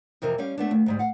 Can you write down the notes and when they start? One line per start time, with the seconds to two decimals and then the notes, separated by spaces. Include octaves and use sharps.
0.22 F2 C3 E3 A#4 D#5
0.38 G3 C#4 G4 F5
0.58 A3 B3 D4
0.71 D#2
0.86 D2 G#2 G3
0.99 F5 F#5